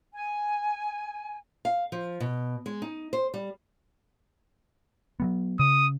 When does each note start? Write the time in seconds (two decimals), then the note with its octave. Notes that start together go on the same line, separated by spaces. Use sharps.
0.13 G#5
1.65 F5
1.92 F3
2.20 B2
2.66 G#3
2.82 D#4
3.13 C5
3.34 G3
5.20 F#3 G3 B3
5.60 C#3 D#6